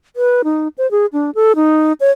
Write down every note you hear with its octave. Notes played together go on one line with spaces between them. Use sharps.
B4
D#4
C5
G#4
D4
A4
D#4
C#5